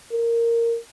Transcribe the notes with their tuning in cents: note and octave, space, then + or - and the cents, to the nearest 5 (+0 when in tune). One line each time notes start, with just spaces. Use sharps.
A#4 -10